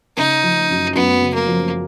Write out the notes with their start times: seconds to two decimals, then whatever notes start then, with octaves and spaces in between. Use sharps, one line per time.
0.17 C#3 D#4
0.43 F3
0.70 F#2
0.95 F#2 B3
1.21 C#3
1.34 A#3
1.48 F3